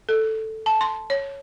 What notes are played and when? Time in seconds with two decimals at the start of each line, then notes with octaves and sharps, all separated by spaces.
0.09 A4
0.66 A5
0.81 C6
1.10 C#5